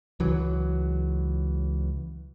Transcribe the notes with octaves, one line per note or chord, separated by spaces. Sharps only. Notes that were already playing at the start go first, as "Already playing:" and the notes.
C#2 E3 F#3